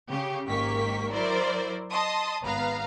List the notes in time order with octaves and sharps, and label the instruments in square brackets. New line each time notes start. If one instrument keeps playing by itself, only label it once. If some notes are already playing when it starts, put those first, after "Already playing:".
[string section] C#3 G4
G#1 G#2 A#3 G4 C#6 B6
F#3 E4 A#4 C5 D5
D#5 A5 C6 D#6
G#1 B3 B4 F5 A#5